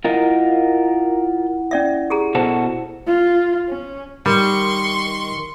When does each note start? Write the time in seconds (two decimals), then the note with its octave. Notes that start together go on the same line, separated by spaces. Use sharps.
0.05 E4 F4 A#4 D#5 F#5
1.71 C#4 D5 E5
2.10 G4 G#4 A#5
2.35 B2 F#4 A4 C5
3.07 F4
3.69 C#4
4.26 D#3 G3 C6 C#6